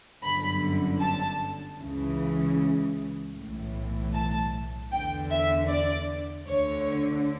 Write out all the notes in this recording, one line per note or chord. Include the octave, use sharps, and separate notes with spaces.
G1 F#2 D3 B5
A5
C#2 C#3 E3
B1 A2 E3
A5
E2 D3 G5
E5
D5
D2 D3 C#5